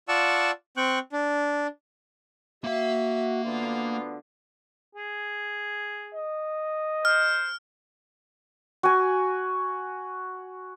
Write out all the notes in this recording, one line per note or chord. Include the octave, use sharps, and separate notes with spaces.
F4 D5 F#5 A5 C#6 E6
C4 G5 C#6 F#6
D4
A#3 F#4 E5 F5
D2 D3 B3 F4
G#4
D#5
C5 F6
F#4 G#5